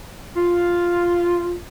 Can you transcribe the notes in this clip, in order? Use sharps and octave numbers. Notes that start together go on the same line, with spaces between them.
F4